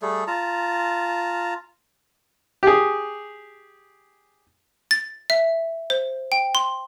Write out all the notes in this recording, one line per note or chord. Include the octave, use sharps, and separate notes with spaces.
G3 A3 G#4 A4
F4 A5 A#5
G4 G#4
A6
E5
C5
G5
C6